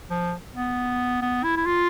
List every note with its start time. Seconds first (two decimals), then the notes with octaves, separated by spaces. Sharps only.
0.10 F3
0.54 B3
1.22 B3
1.44 E4
1.57 E4
1.66 F4